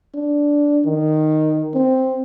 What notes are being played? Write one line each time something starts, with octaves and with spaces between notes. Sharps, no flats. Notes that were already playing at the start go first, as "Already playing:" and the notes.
D4
D#3
C4